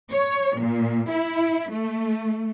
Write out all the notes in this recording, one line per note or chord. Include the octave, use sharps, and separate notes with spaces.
C#5
A#2
E4
A3